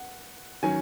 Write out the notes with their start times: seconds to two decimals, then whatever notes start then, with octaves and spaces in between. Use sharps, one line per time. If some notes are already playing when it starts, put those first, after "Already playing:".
Already playing: F#5
0.63 D#3 F#3 C#4 G#5